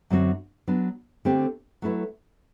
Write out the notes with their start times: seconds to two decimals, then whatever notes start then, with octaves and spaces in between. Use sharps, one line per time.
0.10 F#2 D3 F#3 C4 F#4
0.68 F#3 B3 D4
1.25 D3 A3 C4 G4
1.82 F#3 A3 E4 B4